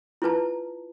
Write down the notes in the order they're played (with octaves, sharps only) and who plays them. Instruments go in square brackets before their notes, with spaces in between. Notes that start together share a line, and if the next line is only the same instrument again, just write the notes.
[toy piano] E4 F4 B4 A5